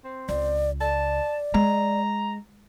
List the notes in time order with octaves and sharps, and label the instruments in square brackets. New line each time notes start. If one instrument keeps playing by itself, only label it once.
[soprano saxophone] C4
[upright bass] C#2 [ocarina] D5
[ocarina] D5 [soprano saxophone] A5
[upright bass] G#3 [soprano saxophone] A#5